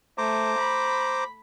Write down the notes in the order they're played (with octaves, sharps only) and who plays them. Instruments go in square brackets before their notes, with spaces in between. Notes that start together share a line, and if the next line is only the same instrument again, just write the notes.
[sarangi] A3 [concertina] C5 A#5 D6
[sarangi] B5